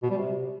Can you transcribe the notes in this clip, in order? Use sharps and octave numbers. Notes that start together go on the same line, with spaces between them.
B2
G3
C3